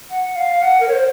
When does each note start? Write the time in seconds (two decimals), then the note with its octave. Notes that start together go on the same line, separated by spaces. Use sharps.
0.11 F#5
0.36 F5
0.62 F#5
0.80 A#4
0.88 C#5
0.93 C5